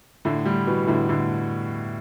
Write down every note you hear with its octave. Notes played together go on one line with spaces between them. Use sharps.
A2 D3
D3 G3
B2 E3
A2 D3
A2 D3